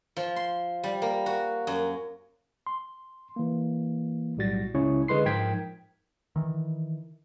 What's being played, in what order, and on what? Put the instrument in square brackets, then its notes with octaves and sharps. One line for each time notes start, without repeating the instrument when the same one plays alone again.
[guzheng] F3
C6
G3
A#3
F#4
F#2
[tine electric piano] C6
E3 A#3
B1 A2 G3 F#4 A6 A#6
C#2 C#3 C#4 E4 C#5 C#6
D3 G#3 B4 C6 C7
G#2 F3 A#4 G5 G#6 B6
[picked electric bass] D#3 E3